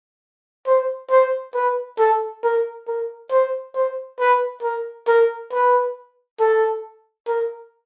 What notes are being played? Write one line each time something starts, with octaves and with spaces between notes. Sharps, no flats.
C5
C5
B4
A4
A#4
A#4
C5
C5
B4
A#4
A#4
B4
A4
A#4